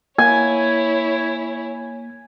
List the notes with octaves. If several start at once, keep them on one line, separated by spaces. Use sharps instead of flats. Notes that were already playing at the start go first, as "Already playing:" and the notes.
A#3 E4 C#5 G#5